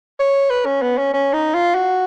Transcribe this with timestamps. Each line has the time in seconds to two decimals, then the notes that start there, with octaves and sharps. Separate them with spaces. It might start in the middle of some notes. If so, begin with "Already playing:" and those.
0.20 C#5
0.50 B4
0.66 C#4
0.82 B3
0.98 C#4
1.14 C#4
1.33 D#4
1.54 F4
1.75 F#4